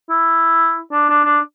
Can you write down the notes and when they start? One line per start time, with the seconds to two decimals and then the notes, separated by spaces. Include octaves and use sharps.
0.10 E4
0.92 D4
1.09 D4
1.25 D4